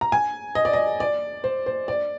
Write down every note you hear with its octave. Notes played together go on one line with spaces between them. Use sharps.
A#5
G#5
D#5
D5
D#5
D5
C5
C5
D5